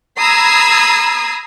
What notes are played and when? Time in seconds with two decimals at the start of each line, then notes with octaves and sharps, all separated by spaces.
0.21 A#5 B5 D#6 E6 G#6 C7